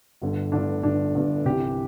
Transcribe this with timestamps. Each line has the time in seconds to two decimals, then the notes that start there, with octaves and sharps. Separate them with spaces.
0.22 G1 G2 D3
0.52 G1 G2 D3 D4
0.83 G1 G2 D3 D4
1.15 G1 G2 D3
1.45 C2 C3 E3 G4